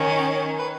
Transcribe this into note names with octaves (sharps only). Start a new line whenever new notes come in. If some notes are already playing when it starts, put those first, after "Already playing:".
Already playing: D#3 C#4
B4